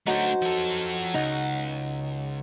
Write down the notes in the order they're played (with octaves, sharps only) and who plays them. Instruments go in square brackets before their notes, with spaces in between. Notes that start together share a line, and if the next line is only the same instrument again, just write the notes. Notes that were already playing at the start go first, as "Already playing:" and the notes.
[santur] F#3 [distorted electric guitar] A3 D4 [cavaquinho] D#4 C5
[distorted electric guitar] F3 A4
[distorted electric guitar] C#2 [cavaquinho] D#4 F#5